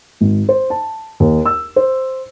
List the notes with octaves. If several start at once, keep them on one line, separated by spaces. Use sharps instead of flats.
G#1
C5
A5
D#2
E6
C5